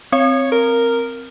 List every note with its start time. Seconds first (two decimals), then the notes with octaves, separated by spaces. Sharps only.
0.12 C4 C#5
0.52 A#4